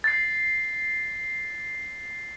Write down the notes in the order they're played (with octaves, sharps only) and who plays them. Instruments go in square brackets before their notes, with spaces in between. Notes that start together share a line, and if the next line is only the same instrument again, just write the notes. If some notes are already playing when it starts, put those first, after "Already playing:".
[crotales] A6 C7